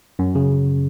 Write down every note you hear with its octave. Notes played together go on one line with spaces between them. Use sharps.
F#2
C#3